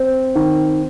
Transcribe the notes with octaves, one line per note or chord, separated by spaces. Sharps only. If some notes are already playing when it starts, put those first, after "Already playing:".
Already playing: C4
D#3